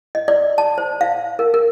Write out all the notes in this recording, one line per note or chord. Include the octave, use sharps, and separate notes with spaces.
D#5
D5
A5
C5
F5
A#4
A#4